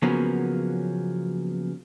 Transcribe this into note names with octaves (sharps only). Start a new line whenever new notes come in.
C#3 F3 F#3 A#3 B3 C#4